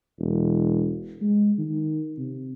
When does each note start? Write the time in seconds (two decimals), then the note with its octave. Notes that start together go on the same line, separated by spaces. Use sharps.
0.20 E1
1.22 G#3
1.59 D#3
2.18 C3